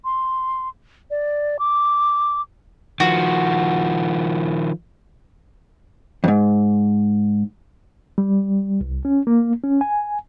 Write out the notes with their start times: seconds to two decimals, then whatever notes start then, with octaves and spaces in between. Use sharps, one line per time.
0.05 C6
1.11 D5
1.59 D6
3.00 D#3 F3 F#4
6.24 F2 G#2
8.18 G3
8.81 C2
9.05 C#4
9.27 A#3
9.64 C#4
9.81 G#5